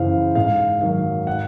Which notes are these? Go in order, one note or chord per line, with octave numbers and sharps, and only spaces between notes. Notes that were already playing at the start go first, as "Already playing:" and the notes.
Already playing: F#2 C#3 E3 C5 F5
G#2 F5
D#3 F#3 F5
F#5